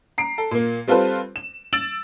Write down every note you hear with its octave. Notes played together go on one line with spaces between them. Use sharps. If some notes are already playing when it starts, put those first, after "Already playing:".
A#5 C7 D7
A4
A#2 A#3
G3 C4 F4 A4 B4 C5
E7
E6 A6 D7 E7 F#7